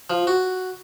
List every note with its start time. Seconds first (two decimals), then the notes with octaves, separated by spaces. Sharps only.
0.10 F3
0.27 F#4